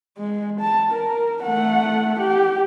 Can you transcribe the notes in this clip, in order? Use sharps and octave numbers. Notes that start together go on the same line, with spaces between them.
G#3
A5
A#4
A3 F#5
G4